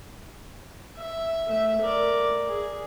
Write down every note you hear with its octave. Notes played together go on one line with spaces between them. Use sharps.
E5
A3 E5
A#4 D5
G#4